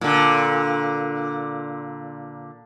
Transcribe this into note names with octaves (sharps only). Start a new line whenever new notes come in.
A#2 D3